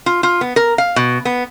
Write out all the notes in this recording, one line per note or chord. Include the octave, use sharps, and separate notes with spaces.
F4
F4
B3
A#4
F5
B2
B3